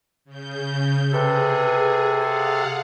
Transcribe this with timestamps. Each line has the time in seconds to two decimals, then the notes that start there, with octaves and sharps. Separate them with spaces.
0.25 C#3 G6
1.13 C3 G#4 A4 B4
2.19 G#4 F5 F#5